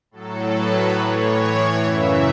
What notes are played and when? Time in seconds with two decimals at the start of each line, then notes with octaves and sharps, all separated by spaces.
0.11 A2 F#3 A4
0.53 B4
0.94 A2 E3 C#5
1.77 F#2 C#3 E3 E5